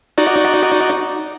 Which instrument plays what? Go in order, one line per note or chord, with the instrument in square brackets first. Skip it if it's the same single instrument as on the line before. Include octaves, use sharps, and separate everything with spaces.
[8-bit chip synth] D#4 F#4 D5